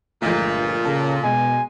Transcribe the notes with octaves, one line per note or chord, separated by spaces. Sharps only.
G1 A#2 F3 G#3 A3
C#3 A4
B2 G#3 G#5